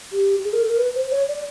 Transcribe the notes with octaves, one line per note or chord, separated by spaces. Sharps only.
G4
G#4
A#4
A4
A#4
B4
C5
C#5
D5